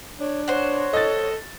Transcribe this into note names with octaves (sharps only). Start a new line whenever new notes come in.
D4 C#5
F#4 C5 C#5
A4 D#5 A6